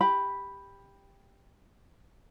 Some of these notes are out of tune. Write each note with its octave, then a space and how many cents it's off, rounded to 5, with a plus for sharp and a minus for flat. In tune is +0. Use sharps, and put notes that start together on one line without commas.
G4 +10 B5 +0